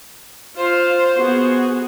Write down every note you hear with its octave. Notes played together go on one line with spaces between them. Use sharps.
F4 C5
B3 F#4 G#4